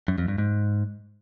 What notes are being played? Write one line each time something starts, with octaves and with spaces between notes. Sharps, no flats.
F#2
F2
G2
G#2